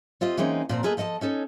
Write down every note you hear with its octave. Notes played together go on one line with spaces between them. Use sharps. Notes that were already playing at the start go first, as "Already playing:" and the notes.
C4 F4 G4 D#5
E3 G#3 A#3 C4 C#4 D#4
A#2 F3 C4 A#5
A#3 F4 G#4 A4 B4 D#5
F3 A4 D#5 G5 A5
C#4 D#4 A4 C#5